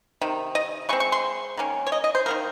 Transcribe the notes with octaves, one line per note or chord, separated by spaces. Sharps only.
C3 D#3
D#5
C#3 G#3 C4 C#6
C#6
C6
D#3 A#3 C#4
C#5
D#5
D#5
C5
D#3 F#3 A#3 A#4